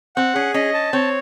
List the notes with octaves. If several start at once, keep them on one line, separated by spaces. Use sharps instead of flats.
C4 F#5
C#4 G#4
C#4 D#5
A5
C4 C#5